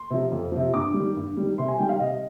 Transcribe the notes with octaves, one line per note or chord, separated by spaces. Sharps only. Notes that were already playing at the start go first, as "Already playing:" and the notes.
Already playing: C6
C3 F3
F2
C3 F3
G2 D6
G3
D#3
G2
D#3 G3
C3 C6
G#5
D#3 G3 G5
F5
C3 D#5